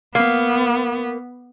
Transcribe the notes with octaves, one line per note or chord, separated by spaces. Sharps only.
A#3 B3